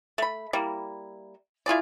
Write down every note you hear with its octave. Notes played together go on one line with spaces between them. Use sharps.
A3 B5
G3 A#3 E4
E4 F4 G#4 D5